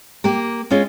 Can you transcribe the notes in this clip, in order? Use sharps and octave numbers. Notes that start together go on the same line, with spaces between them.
A#3 G4 A#4
G#3 C#4 F4